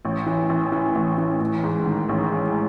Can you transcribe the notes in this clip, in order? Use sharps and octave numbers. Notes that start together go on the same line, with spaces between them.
A1
E3
A1
E3
A1
E3
A1
G#2
D#3
A1
G#3